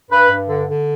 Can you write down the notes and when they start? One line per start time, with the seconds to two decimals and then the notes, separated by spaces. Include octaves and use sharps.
0.10 G2 B4
0.30 G2
0.49 D3
0.68 D3